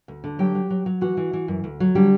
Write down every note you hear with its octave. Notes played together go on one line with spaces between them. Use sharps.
D2
D3
F#3 G4 G5
F#3
F#3
F#3
E3 F#4 F#5
E3
E3
F#2
D2
F#3
D3 G3 G4